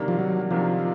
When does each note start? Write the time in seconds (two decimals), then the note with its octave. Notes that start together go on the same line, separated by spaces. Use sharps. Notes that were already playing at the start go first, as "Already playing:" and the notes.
Already playing: C3 D#3 G3 A#3 D4
0.08 F3
0.19 F#3
0.51 C3 D#3 F3 G3 A#3 D4